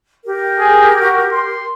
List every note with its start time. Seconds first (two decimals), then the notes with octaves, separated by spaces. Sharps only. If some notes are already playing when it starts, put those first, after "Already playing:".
0.25 G4 A#4
0.59 G#4
1.00 F#4
1.33 C6